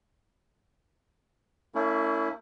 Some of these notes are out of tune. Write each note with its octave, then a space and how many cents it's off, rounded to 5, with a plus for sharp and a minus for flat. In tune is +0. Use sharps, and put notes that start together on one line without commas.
A#3 -45 C#4 +25 E4 -5